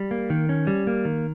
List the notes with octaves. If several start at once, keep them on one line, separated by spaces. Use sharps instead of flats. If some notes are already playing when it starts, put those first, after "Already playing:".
Already playing: G3
A#3
D#3
C#4
G3
A#3
D#3